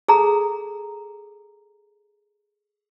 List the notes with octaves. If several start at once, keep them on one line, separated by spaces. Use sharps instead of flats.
G#4 A4 A#5